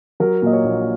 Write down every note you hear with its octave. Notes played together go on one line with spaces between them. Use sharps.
F#3 A#4
A#2 D#5
C#5
A#1